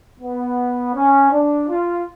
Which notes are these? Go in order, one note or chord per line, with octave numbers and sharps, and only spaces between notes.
B3
C#4
D4
F4